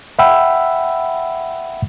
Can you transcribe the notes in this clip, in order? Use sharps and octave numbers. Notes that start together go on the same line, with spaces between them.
E5 F#5 G5 B5 E6